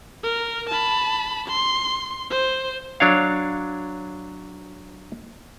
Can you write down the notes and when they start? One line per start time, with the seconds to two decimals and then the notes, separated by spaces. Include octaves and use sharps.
0.24 A#4
0.70 A5 B5
1.49 C6
2.31 C5
3.00 F#3 D4 C#5 F5